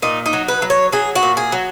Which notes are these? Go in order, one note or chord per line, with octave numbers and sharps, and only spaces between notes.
A#2 D#4
D#4
F#3
B4
F#3
C#5
F#3 G#4
F#4
A#2
G#4
F#3